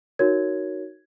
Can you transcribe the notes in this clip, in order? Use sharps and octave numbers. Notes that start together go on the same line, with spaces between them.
D#4 F#4 A#4 C#5 G#6